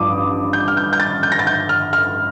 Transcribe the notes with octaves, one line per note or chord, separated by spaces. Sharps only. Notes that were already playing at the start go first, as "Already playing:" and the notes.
Already playing: A1 G2 F3 D6 D#6
G6
F6
G6
G6
A6
G6
A#6
A6
G6
F6
F6